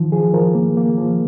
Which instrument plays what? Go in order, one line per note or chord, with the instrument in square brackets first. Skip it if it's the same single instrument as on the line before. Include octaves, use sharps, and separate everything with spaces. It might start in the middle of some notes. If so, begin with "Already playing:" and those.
Already playing: [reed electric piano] D#3 F3
F3 G#4
F3 A#4
A#3
A#3
F3